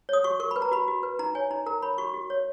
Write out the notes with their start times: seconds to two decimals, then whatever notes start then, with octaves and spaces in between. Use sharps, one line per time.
0.09 C#5 D#6
0.24 F#4 C#6
0.40 A#4 C#6
0.51 B4 B5
0.62 A#5
0.72 F#4 B5
0.88 F#4
1.03 B4
1.19 D#4 A#5
1.35 C#5 G#5
1.51 D#4 A#5
1.66 A#4 A#5
1.82 C#5 B5
1.98 F#4 C#6
2.14 F#4
2.30 C#5